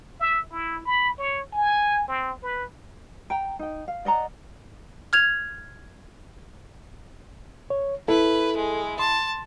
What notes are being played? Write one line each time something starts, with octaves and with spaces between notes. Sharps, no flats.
E5
E4
B5
C#5
G#5
C4
B4
G5 A#5
D#4 G5
F5
D5 D#5 F#5 A#5
F6 G#6 F7
C#5
E4 A4 B4
G#3
A5 C6